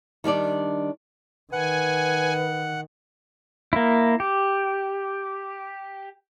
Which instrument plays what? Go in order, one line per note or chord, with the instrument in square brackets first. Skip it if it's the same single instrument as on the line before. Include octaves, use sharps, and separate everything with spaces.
[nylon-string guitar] D#3 G3 D4 D5
[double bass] D#3 [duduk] B4 [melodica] F#5 [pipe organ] G#5
[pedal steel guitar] A#3 E4
G4